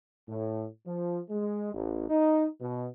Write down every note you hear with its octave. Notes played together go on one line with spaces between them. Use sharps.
A2
F3
G#3
A1
D#4
B2